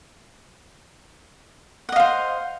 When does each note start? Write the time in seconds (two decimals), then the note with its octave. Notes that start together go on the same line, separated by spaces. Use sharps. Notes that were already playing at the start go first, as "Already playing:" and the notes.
1.89 F#5
1.92 D#5
1.96 F5
2.00 C5